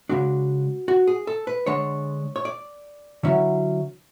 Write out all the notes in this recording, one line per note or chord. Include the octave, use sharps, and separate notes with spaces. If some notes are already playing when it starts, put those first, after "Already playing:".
C#3 G#3 D4 F#4
F#4
G#4
A4
B4
D3 G#3 D4 C#5
C#5
D5
D3 F#3 C#4 E4